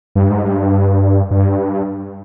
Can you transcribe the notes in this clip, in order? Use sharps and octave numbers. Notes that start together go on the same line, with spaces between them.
G2
G#2
G2
G2